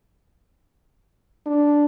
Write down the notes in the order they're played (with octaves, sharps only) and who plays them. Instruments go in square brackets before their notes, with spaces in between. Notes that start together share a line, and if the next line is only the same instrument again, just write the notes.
[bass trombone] D4